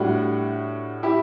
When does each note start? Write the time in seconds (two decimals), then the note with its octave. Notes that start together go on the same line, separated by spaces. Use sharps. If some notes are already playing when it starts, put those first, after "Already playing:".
Already playing: A2 G3 D4 F#4
1.03 E4 G4